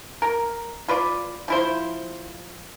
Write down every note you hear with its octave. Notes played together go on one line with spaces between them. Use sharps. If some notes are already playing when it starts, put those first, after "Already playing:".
A#4
F4 B4 D5
F3 E4 C5